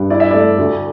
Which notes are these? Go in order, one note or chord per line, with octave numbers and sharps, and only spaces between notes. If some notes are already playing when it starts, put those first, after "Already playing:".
Already playing: G2
E4 D5
E5
A3 D5
D2